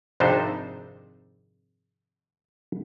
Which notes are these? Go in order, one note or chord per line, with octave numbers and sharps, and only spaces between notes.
G#1 F2 C3 D4 D#4 C5